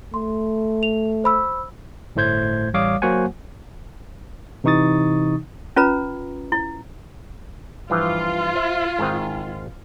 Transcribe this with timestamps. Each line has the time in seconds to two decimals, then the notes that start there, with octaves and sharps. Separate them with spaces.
0.14 A3 C6
0.83 F7
1.24 C5 B5 E6
2.15 G1 A2 A3 C5 G6 G#6
2.74 A1 G3 C#5 F5 D6 D#6
3.02 F#3 A#3 F#4 C5 F#5 G#5
4.64 C3 E3 D#4 C#6 D#6 A6
5.76 C#4 F4 B4 A#5
6.52 E4
7.90 G2 E3 F3 F4
8.56 C5 E5
8.99 G#2 D#3 C4